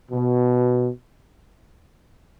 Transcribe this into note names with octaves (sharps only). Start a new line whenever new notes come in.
B2